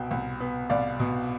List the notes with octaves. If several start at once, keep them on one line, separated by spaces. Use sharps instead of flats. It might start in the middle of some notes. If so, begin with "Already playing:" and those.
Already playing: C2 B2 G5
C2
B3
C2 D5 F5
B2